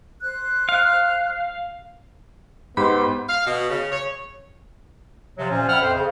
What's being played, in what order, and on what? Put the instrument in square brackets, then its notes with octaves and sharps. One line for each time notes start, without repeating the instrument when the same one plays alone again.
[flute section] C5 F#6
[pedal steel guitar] F5
[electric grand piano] G#2 G4 [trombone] B3 [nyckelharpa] C5 [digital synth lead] B5
[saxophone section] F5
B2
C#3
C#5
[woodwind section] C3 F3 F#3
A#2 F3 C#4
E5 F#5 G5 B5 F6
F2 C5
C#3